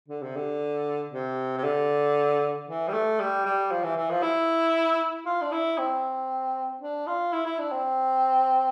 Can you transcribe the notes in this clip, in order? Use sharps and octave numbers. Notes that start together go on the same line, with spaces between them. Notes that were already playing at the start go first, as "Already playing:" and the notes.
D3
C3
D3
C3
C3
D3
E3
G3
A3
G3
G3
F3
E3
E3
F3
E4
F4
D4
E4
C4
D4
F4
E4
E4
D4
C4